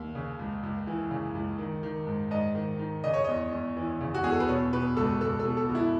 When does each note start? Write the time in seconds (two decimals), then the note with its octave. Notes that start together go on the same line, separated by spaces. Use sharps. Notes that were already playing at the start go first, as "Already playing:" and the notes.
Already playing: D#2
0.15 C#3
0.39 C#2
0.63 C#2
0.87 E3
1.11 C#3
1.35 C#2
1.58 D#3
1.83 D#3
2.07 G#2
2.31 G#2 D#5
2.55 D#3
2.79 D#3
3.04 C#3 D#5
3.14 C#5
3.24 E2 D#5
3.52 E2
3.77 E3
4.00 C#3
4.15 F#4
4.24 E2 G#4
4.32 A4
4.40 B4
4.48 B2 C#5
4.73 B2 B4
4.97 C#2 A4
5.21 C#2 A4
5.39 A4
5.45 B2
5.57 A4
5.69 B2
5.75 E4